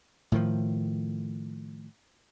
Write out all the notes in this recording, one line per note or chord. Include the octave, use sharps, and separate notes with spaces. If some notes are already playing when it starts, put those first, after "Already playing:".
A2 D#3 F3